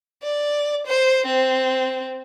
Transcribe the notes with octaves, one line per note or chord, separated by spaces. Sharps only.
D5
C5
C4